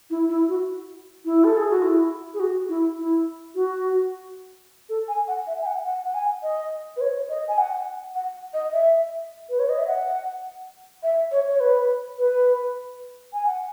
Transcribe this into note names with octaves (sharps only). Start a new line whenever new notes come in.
E4
E4
F#4
E4
A4
G#4
F#4
E4
G#4
F#4
E4
E4
F#4
A4
G#5
F#5
E5
G#5
F#5
F#5
F#5
G#5
D#5
B4
C#5
D#5
G#5
F#5
F#5
D#5
E5
B4
C#5
D#5
E5
F#5
E5
C#5
C#5
B4
B4
G#5
F#5